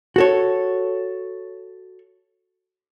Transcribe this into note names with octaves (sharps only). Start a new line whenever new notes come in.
F#4 A4 C#5